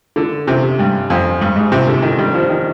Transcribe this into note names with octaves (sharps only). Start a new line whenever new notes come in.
D3
C3
G2
F2
G2
G#2
C3
D3
D#3
G3
F3
D#3